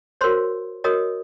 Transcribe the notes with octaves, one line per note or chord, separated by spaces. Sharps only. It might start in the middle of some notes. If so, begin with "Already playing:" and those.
F#4 A#4 C5 C#5 C6
F#4 A#4 C#5 D#5 D#6